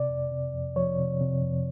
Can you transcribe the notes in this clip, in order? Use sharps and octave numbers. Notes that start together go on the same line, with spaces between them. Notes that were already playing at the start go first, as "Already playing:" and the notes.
Already playing: C3 D5
F2
C3
F2
F3 C#5
C3
C3
F2